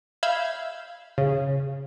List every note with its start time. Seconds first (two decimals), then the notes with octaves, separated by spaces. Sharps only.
0.23 E5 F5 B5 G6 G#6
1.18 C#3